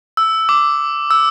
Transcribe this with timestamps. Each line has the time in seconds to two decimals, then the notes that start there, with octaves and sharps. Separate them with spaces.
0.17 E6
0.49 D6
1.11 E6